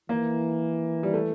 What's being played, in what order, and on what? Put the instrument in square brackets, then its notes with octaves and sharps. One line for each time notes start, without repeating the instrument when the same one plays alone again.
[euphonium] E3 [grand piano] A#3
[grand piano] G3
A3